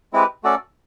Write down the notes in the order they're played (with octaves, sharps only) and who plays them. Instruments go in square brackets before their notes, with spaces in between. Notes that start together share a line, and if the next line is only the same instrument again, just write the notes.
[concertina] G#3 C4 E4 G4 B4
A3 C#4 F#4 A4 D5